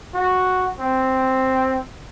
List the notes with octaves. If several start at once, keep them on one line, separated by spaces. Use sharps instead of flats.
F#4
C4